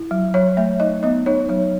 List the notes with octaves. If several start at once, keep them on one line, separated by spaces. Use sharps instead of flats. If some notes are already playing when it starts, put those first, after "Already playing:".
Already playing: E4
F#3
F#3 C#5
A3 E5
D#4 D#5
B3 D#5
D#4 C#5
F#3 C#5